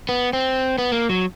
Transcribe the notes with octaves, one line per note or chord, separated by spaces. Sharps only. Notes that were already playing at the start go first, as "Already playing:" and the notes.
B3
C4
B3
A#3
F#3